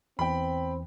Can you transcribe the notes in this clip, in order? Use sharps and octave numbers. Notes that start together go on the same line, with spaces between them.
E2 E3 C4 G5 B5